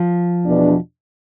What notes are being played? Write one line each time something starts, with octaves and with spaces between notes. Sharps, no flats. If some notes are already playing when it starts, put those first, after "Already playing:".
Already playing: F3
E2 B2 B3 D4